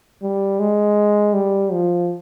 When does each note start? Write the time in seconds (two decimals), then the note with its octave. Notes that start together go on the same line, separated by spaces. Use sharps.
0.23 G3
0.59 G#3
1.34 G3
1.72 F3